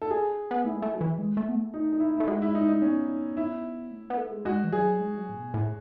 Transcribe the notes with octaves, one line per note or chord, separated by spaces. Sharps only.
A4
G#4
B3
A3 E4
G#3
A3
F#3
E3
G#3
A3
B3
A3
D#4
D#4
E4
A3 E4
G#3 F#4
E4
D#4
D#4
B3 C#4
E4
A3
B3
A3
G#3
G#3 F#4
E3
F#3 G#4
G#3
F#3
A2
B2
A2